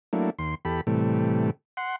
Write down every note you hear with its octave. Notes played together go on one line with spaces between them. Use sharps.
F#3 A3 A#3 D4 E4
D#2 C6
E2 G4 A4 B5
A2 C3 E3 G3 A3
F#5 C6